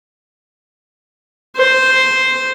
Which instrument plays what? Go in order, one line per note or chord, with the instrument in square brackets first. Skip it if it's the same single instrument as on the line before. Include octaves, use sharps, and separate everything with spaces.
[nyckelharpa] C5